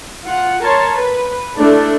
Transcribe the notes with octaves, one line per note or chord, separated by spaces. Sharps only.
F4 F#5
A#4 C#5 A5 C6
B4
A3 D4 E4 A4